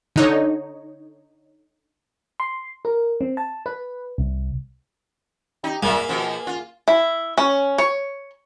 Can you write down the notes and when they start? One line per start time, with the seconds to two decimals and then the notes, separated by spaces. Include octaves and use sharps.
0.16 D3 D#4 C#5
2.40 C6
2.85 A#4
3.21 C4
3.37 A5
3.66 B4
4.18 C2
5.64 D#4 G4
5.83 A#2 A#3 G#4 E5
6.09 B2 F3
6.47 F4
6.88 E4
7.38 C#4
7.78 C#5